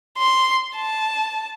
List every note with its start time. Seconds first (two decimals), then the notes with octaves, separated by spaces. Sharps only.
0.18 C6
0.76 A5